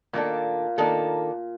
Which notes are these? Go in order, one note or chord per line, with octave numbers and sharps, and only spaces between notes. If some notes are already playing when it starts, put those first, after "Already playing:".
A#2 D#3 A#3 D4 A4
D#3 A#3 D4 A4